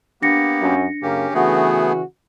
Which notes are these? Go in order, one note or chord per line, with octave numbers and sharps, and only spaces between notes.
A#3 B3 D4 G4 A#6 C#7
F#2
F#2 C#3 A#3 C#4 G4
C#3 E3 A3 B3 F#4 G#4